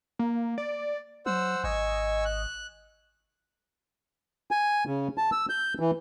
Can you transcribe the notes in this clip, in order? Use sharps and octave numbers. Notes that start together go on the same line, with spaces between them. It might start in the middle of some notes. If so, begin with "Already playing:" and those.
A#3
D5
F#3 C5 F#5 E6
G#1 D#5 G#5 C#6 E6
F#6
G#5
C#3
A5
E6
G6
E3